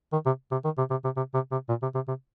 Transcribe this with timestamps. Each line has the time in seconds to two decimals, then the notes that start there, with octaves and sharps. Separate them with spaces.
0.13 D#3
0.26 C3
0.52 C3
0.65 D#3
0.78 C3
0.90 C3
1.04 C3
1.17 C3
1.34 C3
1.52 C3
1.69 A#2
1.82 C3
1.95 C3
2.08 C3